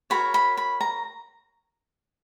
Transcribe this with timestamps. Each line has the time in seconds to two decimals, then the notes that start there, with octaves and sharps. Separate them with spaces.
0.10 F#4 A#4 C#5 B5
0.34 B5
0.57 B5
0.81 A#5